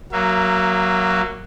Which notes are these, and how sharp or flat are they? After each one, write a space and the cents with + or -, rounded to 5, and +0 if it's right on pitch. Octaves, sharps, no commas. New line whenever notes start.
F#3 +0 A#3 +0 E5 +35